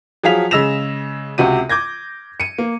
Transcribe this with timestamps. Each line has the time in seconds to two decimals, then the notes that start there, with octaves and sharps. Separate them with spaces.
0.23 F3 F#3 G#4 F5 B6 F7
0.51 C#3 G#3 E6 A#6 E7 F7
1.38 C#2 C3 F#4 D#7
1.69 D6 G6 G#6 A#6
2.40 C#7 D#7
2.58 A#3